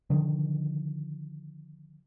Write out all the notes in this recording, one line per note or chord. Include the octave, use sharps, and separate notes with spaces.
D3 D#3 F3